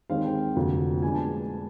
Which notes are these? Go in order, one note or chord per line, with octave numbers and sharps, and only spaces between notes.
D#2 D#3 G#3 C4 F5
G5
F1 F2 D3 F#3 A#3
A#2 F3 G#3 B3 D4 G#5
A5